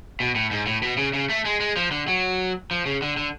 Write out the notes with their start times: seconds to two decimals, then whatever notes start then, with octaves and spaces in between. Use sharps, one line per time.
0.20 B2
0.35 A2
0.51 G#2
0.66 A2
0.82 B2
0.97 C#3
1.14 C#3
1.29 A3
1.45 G#3
1.60 G#3
1.77 F3
1.91 D3
2.08 F#3
2.71 F3
2.86 C#3
3.02 D3
3.17 D3